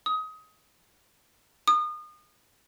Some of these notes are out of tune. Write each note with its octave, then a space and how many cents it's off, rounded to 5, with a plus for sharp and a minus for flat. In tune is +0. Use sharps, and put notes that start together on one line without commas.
D#6 +20
D#6 -30